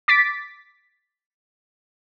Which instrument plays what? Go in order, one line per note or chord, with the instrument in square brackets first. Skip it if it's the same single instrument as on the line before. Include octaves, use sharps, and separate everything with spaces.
[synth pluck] D6 A6 B6 D7